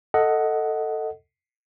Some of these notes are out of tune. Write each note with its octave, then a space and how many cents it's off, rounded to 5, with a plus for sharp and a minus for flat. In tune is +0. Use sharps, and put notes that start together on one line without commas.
A4 +15 D#5 +10 F#5 +0